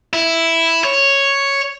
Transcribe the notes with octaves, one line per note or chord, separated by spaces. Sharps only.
E4
C#5